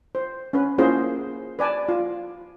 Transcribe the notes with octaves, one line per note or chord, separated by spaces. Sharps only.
C5
C#4 B4
A#3 C#4 E4 F4 G#4 C5
B4 D5 G#5 A5
F4